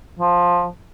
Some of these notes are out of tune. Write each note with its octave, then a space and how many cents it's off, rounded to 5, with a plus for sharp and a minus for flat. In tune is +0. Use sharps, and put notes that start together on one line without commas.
F3 +10